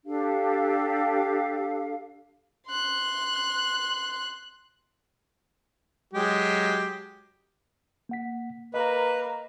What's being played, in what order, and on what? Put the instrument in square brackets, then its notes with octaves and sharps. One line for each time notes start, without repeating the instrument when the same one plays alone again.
[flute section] D4 G4 A4 F5
[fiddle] C6 F#6
[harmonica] F#3 G#3 G4
[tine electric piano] A#3 F#5 B6
[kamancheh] A#3 A#4 [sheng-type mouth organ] B4 [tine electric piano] D#5